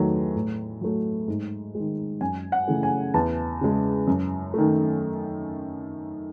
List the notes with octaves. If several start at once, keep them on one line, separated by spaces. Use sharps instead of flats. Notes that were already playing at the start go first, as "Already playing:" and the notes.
Already playing: E2 D#3 F#3 A3
A2
F#3 A3
G#2
D#3 G#3
F#2 G#5
F#5
C#3 E3 A3
G#5
E2 A5
C#3 G#3
F#2
D#3 A3